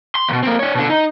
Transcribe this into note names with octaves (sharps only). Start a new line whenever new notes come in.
C6
D#2 B2
A#3 C4
D4 C#5
B2 D3
D#4